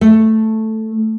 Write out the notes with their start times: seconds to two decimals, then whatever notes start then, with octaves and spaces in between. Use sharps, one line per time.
0.01 A3